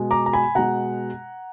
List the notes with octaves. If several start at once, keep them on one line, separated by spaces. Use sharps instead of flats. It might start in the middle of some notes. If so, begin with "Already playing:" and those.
Already playing: B2 G#3
A#5 D6
A#5
G#5 B5
B2 G#3 F#5 A#5